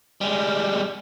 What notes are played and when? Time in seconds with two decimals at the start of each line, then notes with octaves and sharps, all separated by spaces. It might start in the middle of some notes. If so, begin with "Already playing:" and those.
0.21 G3 G#3